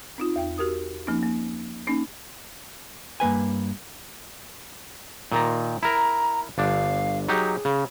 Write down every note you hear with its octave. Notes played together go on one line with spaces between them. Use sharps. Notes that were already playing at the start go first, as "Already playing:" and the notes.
C4 D#4 F4
E2 G5
F#4 G4 A#4 D#6
F3 A#3 C4 C#4 D#4
A#3
A#3 C#4 D#4
G2 A#3 B4 G#5
A#2 D#3 A#5
E4 A#4 A#5
G1 D4 F5
F#3 D#4 G4 G#4
C#3